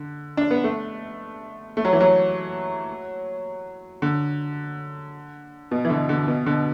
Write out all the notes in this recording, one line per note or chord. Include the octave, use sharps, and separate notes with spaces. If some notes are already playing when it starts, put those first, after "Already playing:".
Already playing: D3
D4
B3
A3
A3
F#3
E3
F#3
D3
B2
E3
D3
D3
B2
D3